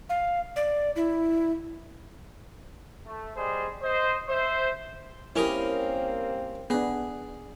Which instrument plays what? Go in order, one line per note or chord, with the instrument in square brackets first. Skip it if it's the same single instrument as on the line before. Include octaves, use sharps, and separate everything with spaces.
[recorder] F5
D5
E4
[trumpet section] A3
G3 G#4 C5 D#5
C5 D#5
C5 E5
[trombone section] G3 A#3 C4 [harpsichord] C#4 A#4 D#6 [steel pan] E4 G4
[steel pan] B3 D4 [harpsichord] G#4